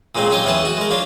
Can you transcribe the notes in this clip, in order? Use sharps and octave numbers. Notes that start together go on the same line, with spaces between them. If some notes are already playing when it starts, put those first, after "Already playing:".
A#2 C#3 G#3 A#3 C4
C#4 G4 C#5 D#5
E2 B3 C#4 G#4 A5
F#4
G#3 A#4
F3 D4 F4 C#5